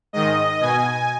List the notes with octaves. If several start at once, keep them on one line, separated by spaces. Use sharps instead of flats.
G#2 D#3 D#5
B2 G#5